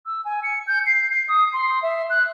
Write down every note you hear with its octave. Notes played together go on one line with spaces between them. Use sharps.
E6
G#5
C#7
G6
C7
C7
D#6
C6
E5
F#6